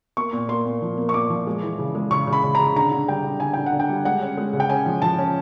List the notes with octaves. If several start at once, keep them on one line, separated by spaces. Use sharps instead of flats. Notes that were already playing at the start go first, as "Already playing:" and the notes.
A#3 C#6
A#2
A#3 C6
A#2
F3
A#3
C#6
A#2 D6
F3
G#3
E3
C#3
G#3
C#3 C#6
C#3
B5
C#3
C#3 A#5
D3 A#5
D3
G3 G5
D3
D3 G#5
D3 G5
F#5
D3
G5
G3
G#3 F#5
C#4
G#3
C#3
G5
C#4 G#5
F3
F3 A5
C#4